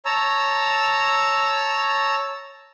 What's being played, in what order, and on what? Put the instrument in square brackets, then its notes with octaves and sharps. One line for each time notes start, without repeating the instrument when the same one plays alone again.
[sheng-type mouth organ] C#5 A5 A#5 E6